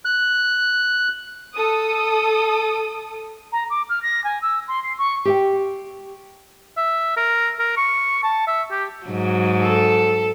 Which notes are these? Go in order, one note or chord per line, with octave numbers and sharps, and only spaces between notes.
F#6
A4 D#6
A#5
D6
F6
A#6
G#5
E6
C6
C7
C#6
G4 E5 G5
E5
A#4
A#4
C#6
A5
E5
G4
G#2 F#3
A4